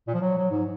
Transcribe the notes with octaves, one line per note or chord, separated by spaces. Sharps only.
A#2
F3
F#3
F#3
G#2